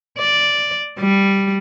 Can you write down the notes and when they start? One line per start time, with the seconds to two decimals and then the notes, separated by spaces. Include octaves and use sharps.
0.19 D5
0.99 G3